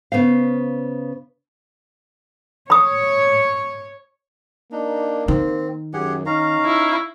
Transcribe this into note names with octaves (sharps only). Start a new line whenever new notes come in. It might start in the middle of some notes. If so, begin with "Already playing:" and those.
C#3 B3 C5 F5
C#5 B5 D#6
A#3 D4 D#4
D#3 C4
F#2 G4 G#4 F#5
C#4 D#4 F5 A#5
E4